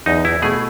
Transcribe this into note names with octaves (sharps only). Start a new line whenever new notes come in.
E2 D#4
E4
B2 A3 G#4